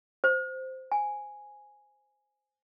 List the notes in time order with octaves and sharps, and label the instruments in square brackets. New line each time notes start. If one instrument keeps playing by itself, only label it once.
[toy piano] C5
G#5